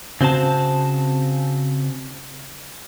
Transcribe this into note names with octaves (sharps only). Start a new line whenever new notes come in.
C#3 C4 F#4 C5 A5